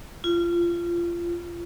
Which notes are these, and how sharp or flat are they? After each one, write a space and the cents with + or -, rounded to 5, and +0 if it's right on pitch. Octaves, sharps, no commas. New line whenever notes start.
F4 -25